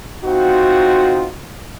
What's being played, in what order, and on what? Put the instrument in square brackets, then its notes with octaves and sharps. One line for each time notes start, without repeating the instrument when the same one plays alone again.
[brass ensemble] C4 D#4 F4 F#4